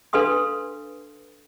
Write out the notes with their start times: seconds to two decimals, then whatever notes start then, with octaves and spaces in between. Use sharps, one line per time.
0.13 D4 A4 B4 F5 C6 D#6